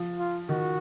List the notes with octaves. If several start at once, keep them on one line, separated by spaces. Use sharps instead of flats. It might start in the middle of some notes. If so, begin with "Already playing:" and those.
Already playing: F3
F4
D#3 F#4